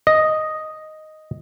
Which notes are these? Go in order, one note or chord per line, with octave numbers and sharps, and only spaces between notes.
D#5